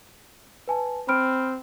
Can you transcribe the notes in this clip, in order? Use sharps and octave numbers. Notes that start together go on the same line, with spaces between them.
B4 G#5 A5
C4 B5 F6 D7